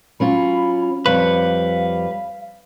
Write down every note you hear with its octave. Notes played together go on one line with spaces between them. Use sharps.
F#3 C#4 F4 B5
F2 G3 B4 C#5 F5